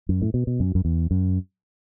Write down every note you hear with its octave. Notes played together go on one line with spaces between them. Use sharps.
F#2
A2
B2
B2
F#2
F#2
E2
F#2